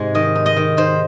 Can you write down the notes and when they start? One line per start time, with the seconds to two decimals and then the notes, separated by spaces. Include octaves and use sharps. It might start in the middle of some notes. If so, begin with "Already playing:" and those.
Already playing: G#2 C3 G#3
0.15 D#3 D#5
0.35 D#4
0.46 D#5
0.56 D#3
0.77 D#3 C5